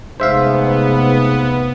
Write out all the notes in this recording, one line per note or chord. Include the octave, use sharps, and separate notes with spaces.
F1 G#2 C3 B3 C5 E5 F5